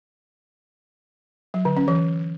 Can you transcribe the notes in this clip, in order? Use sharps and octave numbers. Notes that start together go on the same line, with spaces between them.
F#3
D3
C#4
E3